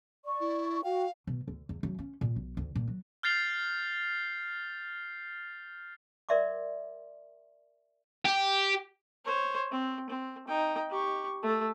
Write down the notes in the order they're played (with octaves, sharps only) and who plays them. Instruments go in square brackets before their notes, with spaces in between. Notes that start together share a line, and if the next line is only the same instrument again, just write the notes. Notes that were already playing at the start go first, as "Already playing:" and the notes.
[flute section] D5 C#6
[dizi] E4
[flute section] F#4 G5 [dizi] F5
[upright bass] B2
D2
E2
F#2
C#4
A#2
B1
D2
A#2
F#3
[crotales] F6 G6 A6 C7 F7 G7
[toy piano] A#4 D5 E5 C6 D6
[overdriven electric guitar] G4
[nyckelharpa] C5 C#5
C4
C4
D#4 G5
G4 C#6
A3 A4